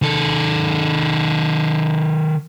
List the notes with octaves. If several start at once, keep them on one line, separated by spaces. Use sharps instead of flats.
D#3 A4